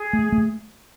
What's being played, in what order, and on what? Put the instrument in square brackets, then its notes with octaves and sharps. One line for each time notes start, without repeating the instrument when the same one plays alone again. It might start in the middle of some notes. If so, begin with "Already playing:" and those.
Already playing: [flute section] G#4
[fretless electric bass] A3
A3